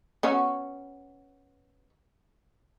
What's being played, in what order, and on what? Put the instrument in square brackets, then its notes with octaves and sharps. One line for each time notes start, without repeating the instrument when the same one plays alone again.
[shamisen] B3 C#4 F#4